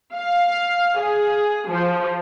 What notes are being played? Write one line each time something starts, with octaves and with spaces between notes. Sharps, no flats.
F5
G#4
F3